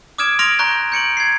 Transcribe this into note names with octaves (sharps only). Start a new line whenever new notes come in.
D6 D#6 F6 G#6 D7 E7
C6 F6 A#6 D7 F7
A#5 C#6 F#6 G6 A#6
G6 C#7 D7 F#7
G#6 C7